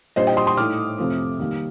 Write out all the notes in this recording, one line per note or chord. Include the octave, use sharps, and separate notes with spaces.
A#2 G3 D4 C5 D#5
D#5 G5
C6 D#6
C6 D#6
A2 A3 D#4 D6 F6
F2 C3 F3 A3
D#3 G3 A#3